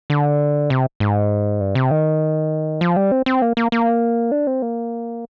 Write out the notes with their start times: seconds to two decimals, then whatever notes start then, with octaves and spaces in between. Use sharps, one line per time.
0.10 D3
0.70 C3
1.00 G#2
1.61 G2
1.75 C3
1.91 D#3
2.81 F3
2.96 G3
3.12 C4
3.26 C4
3.42 A#3
3.57 A#3
3.72 A#3
4.31 D4
4.47 C4
4.62 A#3